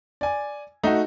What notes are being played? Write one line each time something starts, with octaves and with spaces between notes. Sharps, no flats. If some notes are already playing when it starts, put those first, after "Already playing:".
D5 G#5
A3 D#4 F#4